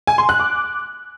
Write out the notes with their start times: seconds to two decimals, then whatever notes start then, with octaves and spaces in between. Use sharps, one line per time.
0.07 G#5
0.18 C6
0.29 F#6
0.40 D6